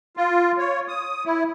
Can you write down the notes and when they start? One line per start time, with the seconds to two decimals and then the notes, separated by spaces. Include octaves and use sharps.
0.17 F4
0.58 C#5
0.88 D#6
1.26 E4